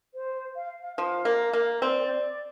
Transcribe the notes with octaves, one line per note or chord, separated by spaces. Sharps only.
C5
F5
F5
F3 F5
A#3
A#3
C4 D5